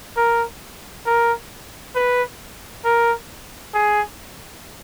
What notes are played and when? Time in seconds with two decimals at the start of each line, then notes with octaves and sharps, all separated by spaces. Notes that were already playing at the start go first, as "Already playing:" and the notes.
0.16 A#4
1.06 A#4
1.95 B4
2.85 A#4
3.74 G#4